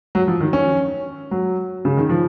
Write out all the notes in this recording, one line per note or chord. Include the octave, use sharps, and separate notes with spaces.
F#3
F3
D#3
C#4
F#3
C#3
D#3
F3